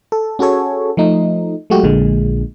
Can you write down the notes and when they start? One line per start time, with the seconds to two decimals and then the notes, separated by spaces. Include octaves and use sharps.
0.12 A4
0.39 C#4 F#4 G#4 A4 C#5
0.97 F3 A3 D#4
1.70 F#3 G#3 A3 F#4 G4
1.83 A#1 A#2 D3 G#3